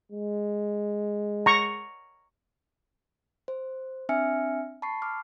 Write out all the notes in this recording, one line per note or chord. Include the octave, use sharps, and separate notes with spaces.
G#3
A#5 C#6
C5
C4 D4 E5 G#5 F6 C#7
A5 B5 C#6 C7
D6 F6